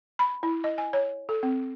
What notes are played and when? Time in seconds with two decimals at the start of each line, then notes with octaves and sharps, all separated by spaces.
0.19 B5
0.43 E4
0.64 D#5
0.78 G#5
0.93 C#5
1.29 A4
1.43 C4